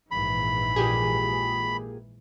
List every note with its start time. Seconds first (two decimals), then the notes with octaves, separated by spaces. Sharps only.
0.11 A#1 G#2 E3 B5
0.76 A#2 G4 G#4